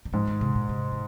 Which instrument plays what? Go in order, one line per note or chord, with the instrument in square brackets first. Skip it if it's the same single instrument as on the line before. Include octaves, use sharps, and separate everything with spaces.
[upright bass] D#3
[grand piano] G#2 [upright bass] F3
[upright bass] D#3
C3
A#2
C3
D#3